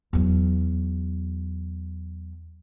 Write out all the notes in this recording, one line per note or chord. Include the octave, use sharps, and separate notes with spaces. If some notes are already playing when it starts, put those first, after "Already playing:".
E2 F#3